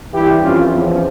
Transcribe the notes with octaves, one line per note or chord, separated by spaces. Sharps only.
G2 E3 E4 G4
F2 E3 C#4 F4
E2 C#3 F3